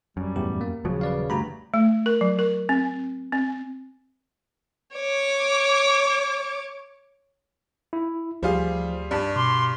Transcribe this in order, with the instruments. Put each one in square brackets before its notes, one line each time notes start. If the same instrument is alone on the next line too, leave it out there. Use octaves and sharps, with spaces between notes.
[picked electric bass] F#2 [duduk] G3
[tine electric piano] E2 A2 G4
A#3
[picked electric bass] D#1 F3 F#3 [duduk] C#3
[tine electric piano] B4 D5 F5
[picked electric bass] D2 G2 [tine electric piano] F#4 A#5 B5
[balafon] A3
A#4
F#3
A#4
C4
C4
[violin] C#5 D6
[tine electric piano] E4
[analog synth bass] D2 [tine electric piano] F3 [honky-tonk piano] G3 F4 G#4
[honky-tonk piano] G2 [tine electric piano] D5 A5
[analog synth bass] B2 [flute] C6 [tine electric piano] D6